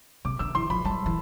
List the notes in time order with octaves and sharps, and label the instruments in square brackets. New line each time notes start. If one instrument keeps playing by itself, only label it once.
[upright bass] C3 [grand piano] D6
[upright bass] D3 [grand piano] E6
[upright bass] E3 [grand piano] C6
[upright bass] F3 [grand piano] B5
[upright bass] G3 [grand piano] A5
[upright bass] E3